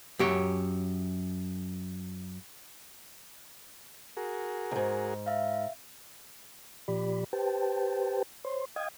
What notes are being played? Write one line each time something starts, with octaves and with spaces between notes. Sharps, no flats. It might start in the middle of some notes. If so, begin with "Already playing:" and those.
F#2 G4 C#5
F#4 G#4 A#4
E2 G#2
E5 F5
A#2 F3 G4 D5 B5
G4 B4 C5 G5 A5
C5 C#5 C6
D#5 F5 G5 D#6 G#6